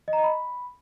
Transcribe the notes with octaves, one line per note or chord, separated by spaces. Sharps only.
D#5
A#5
D#5
B5